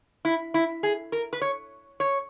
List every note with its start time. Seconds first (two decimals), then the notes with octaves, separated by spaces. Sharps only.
0.25 E4
0.54 E4
0.83 G#4
1.12 A#4
1.33 B4
1.41 C#5
2.00 C#5